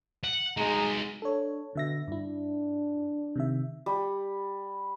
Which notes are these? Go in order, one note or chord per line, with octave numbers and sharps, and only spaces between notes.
F#5
G#3 D#4 F#4 A#5
D4 A4 C#5
B2 D3 E5 A#6
G2 D4 E4
C3 D#3 E5
G3